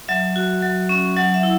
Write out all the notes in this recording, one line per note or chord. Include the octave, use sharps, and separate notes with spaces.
F#3 E5
F#4
F#3
C#4
F#3 F#5
E5
E4